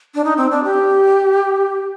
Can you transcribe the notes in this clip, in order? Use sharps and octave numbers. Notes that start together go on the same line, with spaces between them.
D4
D#4
C4
D4
G4